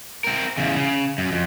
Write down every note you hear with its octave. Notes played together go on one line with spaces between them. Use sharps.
C4 A#4
E2 C#3
C#3
F#2
F2